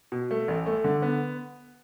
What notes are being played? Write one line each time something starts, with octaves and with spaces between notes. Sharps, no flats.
B2
A3
A1
A3
D3
B3